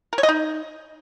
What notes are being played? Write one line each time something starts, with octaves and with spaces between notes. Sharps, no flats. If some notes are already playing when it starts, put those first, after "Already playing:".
A#4
C#5
D#5
D#4